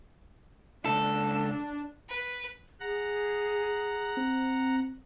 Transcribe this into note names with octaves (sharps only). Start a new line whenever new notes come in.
C#2 D4 A4
B4
G#4 F#5 A#5
C4